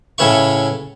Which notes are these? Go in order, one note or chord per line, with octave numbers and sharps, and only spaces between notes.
A2 C#3 C#4 B4 E5 C#6